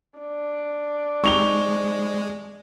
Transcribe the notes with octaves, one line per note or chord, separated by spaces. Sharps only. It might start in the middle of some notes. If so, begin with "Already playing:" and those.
D4
G#3 C4 D#4 G4 C#6 F7 G7